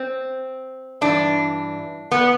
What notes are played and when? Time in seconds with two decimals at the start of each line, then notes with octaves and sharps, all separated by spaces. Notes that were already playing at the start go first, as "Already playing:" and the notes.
Already playing: C4
1.01 G2 E3 D4
2.11 B3